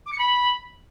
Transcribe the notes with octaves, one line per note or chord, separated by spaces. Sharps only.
D6
C#7
B5